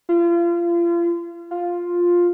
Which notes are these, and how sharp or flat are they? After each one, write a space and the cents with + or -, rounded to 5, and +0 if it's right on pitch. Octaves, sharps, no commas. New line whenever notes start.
F4 -35
F4 +5